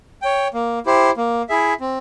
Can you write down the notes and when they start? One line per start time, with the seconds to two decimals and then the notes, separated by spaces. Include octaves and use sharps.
0.22 C#5 G5
0.54 A#3
0.86 E4 G4 C5
1.17 A#3
1.49 E4 G#4 E5
1.80 C4